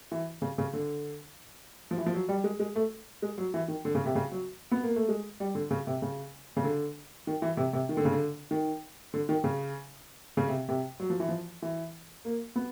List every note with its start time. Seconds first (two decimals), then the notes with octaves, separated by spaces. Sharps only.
0.12 E3
0.42 C#3
0.58 C#3
0.73 D3
1.91 F3
1.98 E3
2.06 F3
2.14 F#3
2.28 G3
2.44 G#3
2.59 G#3
2.76 A3
3.22 G#3
3.38 F#3
3.54 E3
3.68 D#3
3.85 D3
3.95 C#3
4.06 C3
4.15 C#3
4.31 F#3
4.71 B3
4.83 A#3
4.96 A3
5.08 G#3
5.40 G3
5.55 D3
5.71 C#3
5.87 C3
6.02 C#3
6.57 C#3
6.64 D3
7.27 D#3
7.42 E3
7.57 C3
7.73 C3
7.89 D#3
7.97 D3
8.05 C#3
8.12 D3
8.51 D#3
9.14 D3
9.29 D#3
9.44 C#3
10.37 C#3
10.48 C3
10.69 C3
11.00 F#3
11.10 F3
11.20 E3
11.29 F3
11.62 E3
12.25 A#3
12.56 B3